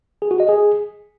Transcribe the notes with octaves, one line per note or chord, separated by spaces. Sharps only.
G#4
F#4
D#5
G#4